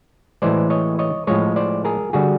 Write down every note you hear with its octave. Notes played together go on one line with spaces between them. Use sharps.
A2 E3 G#3 C5 D5
C#5 D#5
C#5 D#5
A2 F3 G#3 C#5 D#5
C5 D5
G#4 A#4
D3 G3 F#4 G#4